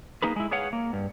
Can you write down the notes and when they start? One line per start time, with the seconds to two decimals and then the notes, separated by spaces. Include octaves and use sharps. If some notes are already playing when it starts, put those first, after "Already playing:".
0.22 A#3 D#4 G#4 B4
0.36 G#3 E4
0.51 G#4 B4 C#5 F5 F#5
0.73 A#3
0.93 G2